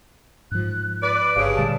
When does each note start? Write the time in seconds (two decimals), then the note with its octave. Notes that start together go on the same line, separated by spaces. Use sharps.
0.51 G#2 F3 F#6
1.02 B4 D5 D7
1.36 G1 G2 C#3
1.56 A#2 D3 G3 A5